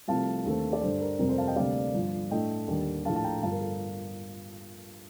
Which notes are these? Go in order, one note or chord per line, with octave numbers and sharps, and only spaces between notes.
C2 C3 F3 A3 F5 A5
D#2 D3 A3 C4
D5
G2 D3 G3 A4 C5
A#4
F1 F2 C3 G3 A#4
A4 C5
F5 A5
D#5 G5
D2 C3 G3 A#3 D4 D5 F5
G1 G2 F3
A2 A3 D4 D#5 G5
D#2 D3 G3
A#1 A2 A3 D4 F5 A5
A5
G5 A#5
G1 G2 F3 F5 A5
A#4
A4